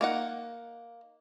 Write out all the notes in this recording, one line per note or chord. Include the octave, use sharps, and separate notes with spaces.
A#3 D#4 F#5